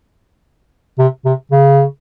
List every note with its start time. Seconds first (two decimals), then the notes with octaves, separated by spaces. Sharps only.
0.99 C3
1.25 C3
1.52 C#3